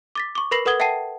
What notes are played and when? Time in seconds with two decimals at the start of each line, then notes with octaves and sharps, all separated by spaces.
0.15 D6 A6 B6
0.35 C#6 D6
0.51 A#4 B4 B5 A#6 C7 F#7
0.65 A4 B4 F#5 D#6 G#6 G7
0.80 E5 F#5 G5 A5 C7 D#7